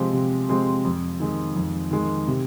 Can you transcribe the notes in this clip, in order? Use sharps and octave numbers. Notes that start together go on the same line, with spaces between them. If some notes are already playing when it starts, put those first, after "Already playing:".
Already playing: C3 F3 G#3 C4 G4
C3
F3 G#3 C4 G4
F2
D#3 G#3
F2
D#3 G#3
C3